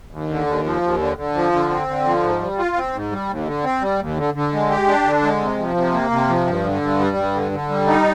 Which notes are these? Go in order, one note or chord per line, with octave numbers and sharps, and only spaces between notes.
D#2
D3
D#2
F3
D#2
D3
D3
F3
D3
C4
D3
F3
G#2
G3
F4
C4
G#2
G3
D#2
D3
C4
G3
D#2
D3
D3
G#3
G4
D4
D3
G#3
C3
F3
C3
A#3
C3
F3
G2
D3
G2
G3
G2
D3
D3
G3
D#4